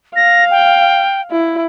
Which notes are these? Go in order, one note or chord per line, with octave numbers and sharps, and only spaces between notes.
F5 A#6
G5
E4